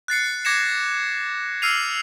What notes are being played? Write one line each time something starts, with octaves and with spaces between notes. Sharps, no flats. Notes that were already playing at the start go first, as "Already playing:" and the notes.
F#6 A6 C7 C#7
D6 G#6 A#6 C#7 E7
E6 F6 C7 D#7 F7